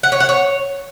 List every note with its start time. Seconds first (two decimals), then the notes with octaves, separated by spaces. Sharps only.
0.03 F#5
0.12 C#5
0.20 F#5
0.29 C#5